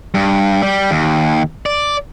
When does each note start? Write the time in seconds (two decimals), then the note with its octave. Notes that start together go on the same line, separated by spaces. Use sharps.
0.14 G2
0.62 G3
0.91 D#2
1.66 D5